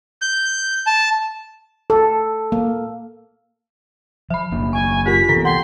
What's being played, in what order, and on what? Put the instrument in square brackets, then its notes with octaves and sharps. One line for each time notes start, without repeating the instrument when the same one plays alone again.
[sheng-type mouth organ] G6
A5
[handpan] A4
A#3
[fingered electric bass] F3 [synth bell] E5 B5
[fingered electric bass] F#1 A#3 D4
[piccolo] G#5 [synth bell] C#6
[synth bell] F4 G4 A#4 [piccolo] B6
[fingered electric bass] D3 E3 B3 [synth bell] A4
[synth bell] F#5 G5 [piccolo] C6